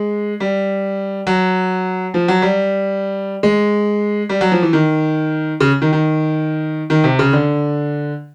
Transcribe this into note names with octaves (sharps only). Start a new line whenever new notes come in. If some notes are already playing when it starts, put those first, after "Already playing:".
Already playing: G#3
G3
F#3
F3
F#3
G3
G#3
G3
F#3
F3
E3
D#3
C#3
D#3
D#3
D#3
C3
C#3
D3